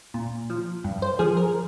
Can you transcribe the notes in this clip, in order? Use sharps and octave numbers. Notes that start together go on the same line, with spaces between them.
A#2
F3
G2
C5
F3 G#4
A#4